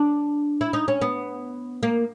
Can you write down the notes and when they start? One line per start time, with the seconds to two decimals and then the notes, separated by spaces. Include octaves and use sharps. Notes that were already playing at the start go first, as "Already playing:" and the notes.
Already playing: D4
0.61 E4
0.73 D#4
0.88 C#4
1.01 B3
1.83 A#3